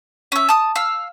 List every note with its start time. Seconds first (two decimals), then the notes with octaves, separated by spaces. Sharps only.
0.32 C#4 E5
0.49 A5 D#6
0.75 F5 E6